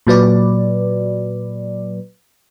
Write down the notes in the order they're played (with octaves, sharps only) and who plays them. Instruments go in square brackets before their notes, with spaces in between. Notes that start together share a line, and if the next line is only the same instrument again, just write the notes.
[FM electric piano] A#2 F#3 B4 D5